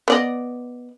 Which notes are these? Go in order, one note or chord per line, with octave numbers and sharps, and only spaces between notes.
B3 D5 D#5